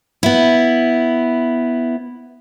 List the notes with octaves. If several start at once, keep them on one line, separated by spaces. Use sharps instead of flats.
B3 E4